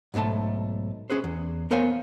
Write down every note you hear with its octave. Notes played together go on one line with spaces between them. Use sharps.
B1 G#2 B2 A3 A5
C#4 G#4 B4 C5
E2
B3 A#4 C5 C#5 F5 G#5